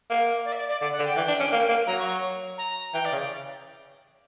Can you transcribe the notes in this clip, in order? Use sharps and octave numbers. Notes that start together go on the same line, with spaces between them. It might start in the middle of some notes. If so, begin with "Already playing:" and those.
A#3
D5
E5
D5
D5
D3 D5
F#5
D3
G5
E3
D4
C#4
A#3
A#3
F#3 A#5
C#6
A#5
E3 G5
D5
C#3